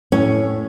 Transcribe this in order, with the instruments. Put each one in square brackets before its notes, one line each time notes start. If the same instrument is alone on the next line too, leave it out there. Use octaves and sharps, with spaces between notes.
[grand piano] A2 [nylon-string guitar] C#4